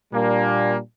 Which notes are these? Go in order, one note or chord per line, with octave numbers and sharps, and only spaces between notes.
A#2 G3 A#3 D4